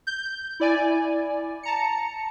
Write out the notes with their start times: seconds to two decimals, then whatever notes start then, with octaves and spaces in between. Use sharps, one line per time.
0.07 G6
0.60 E4 D5 G#5
1.63 A5 A#5 C#7